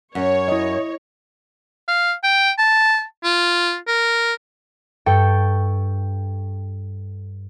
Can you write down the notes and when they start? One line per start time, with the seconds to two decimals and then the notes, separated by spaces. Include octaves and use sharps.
0.15 F#2 C#5
0.48 E4 D#5
1.88 F5
2.23 G5
2.59 A5
3.24 F4
3.88 A#4
5.06 G2 A4 G5 C#6